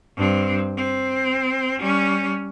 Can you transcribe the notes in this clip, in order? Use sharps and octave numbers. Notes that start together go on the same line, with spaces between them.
G2 C4
C4
G3 C#4